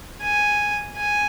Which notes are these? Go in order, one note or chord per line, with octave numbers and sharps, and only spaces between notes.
G#5
G#5